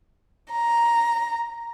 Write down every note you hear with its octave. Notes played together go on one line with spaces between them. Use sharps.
A#5